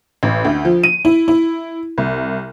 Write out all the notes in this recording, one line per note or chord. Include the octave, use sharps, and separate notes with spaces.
A1
D2
F3
D#7
E4
E4
C2